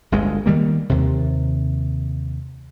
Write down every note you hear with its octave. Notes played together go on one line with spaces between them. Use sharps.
G1 D2 G#3
D#3 G3 A#3
D#2 C3